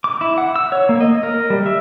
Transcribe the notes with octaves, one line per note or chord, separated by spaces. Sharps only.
D6
E4
F#5
E6
C#5
A#3
D#5
A#4
G3
E5